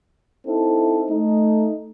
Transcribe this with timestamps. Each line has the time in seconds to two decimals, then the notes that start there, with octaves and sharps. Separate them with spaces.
0.46 C4 D#4 E4 A4
1.09 A3 D#4